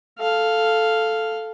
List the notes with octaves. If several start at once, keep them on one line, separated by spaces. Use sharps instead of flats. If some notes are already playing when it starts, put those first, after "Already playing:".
A4 F5